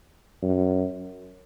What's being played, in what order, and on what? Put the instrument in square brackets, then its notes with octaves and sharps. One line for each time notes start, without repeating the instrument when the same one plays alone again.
[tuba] F#2